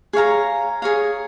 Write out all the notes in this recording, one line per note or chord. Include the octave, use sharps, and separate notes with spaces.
G#4 C#5 F5 A#5
G#4 C#5 F5 A#5